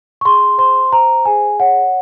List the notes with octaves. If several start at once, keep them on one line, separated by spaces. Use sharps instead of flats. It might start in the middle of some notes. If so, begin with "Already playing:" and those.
C#6
G#4 C6
C5 C6
C5 A#5
G#4 G#5
C#5 F#5